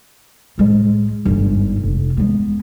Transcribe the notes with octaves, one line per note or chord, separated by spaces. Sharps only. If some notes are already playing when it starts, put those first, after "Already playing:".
A2 G#3
G1 G#2
F1
G#3 B3